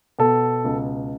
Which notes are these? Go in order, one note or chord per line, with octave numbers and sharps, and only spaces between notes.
B2 A4
C#2